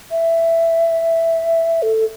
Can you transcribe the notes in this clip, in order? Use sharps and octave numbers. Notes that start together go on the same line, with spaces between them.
E5
A4